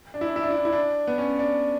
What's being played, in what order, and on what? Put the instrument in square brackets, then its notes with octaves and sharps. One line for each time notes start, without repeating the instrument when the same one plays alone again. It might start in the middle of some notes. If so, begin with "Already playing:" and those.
[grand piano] D4
E4
D4
E4
D4
E4
D4
E4
D4
B3
C#4
D4